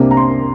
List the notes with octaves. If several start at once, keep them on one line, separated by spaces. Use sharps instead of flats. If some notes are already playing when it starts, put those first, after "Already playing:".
Already playing: C2 C3 A#3 D4
A#5
C6